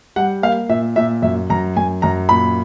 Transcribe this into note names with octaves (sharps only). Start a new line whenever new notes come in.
G3 F#5
A#3 F5
A#2 E5
A#2 E5
F#2 E5
F#2 A#5
F#2 G#5
F#2 A#5
A#2 B5